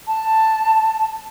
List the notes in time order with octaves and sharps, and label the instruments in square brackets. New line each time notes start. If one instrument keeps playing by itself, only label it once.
[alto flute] A5